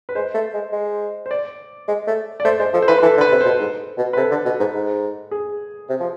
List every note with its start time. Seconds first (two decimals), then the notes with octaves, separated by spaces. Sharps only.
0.09 B4
0.15 G#3 C5
0.35 A3
0.54 G#3
0.73 G#3
1.26 C5
1.31 D5
1.88 G#3
2.07 A3
2.40 D5
2.45 A3 C5
2.59 G#3 C5
2.74 F3 A4
2.82 C5
2.88 E3 B4
2.98 B4
3.03 E3 A4
3.17 D3
3.21 B4
3.32 C3
3.41 B2 C5
3.60 G#2
3.98 B2
4.13 B4
4.17 C3 A4
4.31 D3
4.46 B2
4.60 G#2
4.74 G#2
5.31 G#4
5.89 C3
6.00 F3